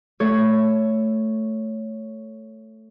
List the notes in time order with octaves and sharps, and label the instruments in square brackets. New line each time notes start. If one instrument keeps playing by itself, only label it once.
[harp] A3 A4 C#5